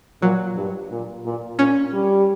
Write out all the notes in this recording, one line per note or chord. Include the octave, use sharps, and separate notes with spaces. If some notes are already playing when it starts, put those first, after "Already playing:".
A#2 F#3
G2
A#2
A#2
A#2 C#4
G3